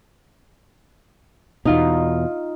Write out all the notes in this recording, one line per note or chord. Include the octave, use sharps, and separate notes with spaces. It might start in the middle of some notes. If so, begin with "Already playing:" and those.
E2 B2 D#4 F4